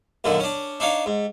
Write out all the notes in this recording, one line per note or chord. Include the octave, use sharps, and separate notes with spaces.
F#2 A#2 D3 D#3
C#4 D4
D4 D#4 C#5 F5
G#2